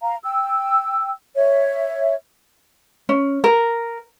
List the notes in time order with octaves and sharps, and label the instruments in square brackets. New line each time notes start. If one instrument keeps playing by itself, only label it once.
[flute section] F5 A#5
G5 E6
C#5 E5
[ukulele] C#4
A#4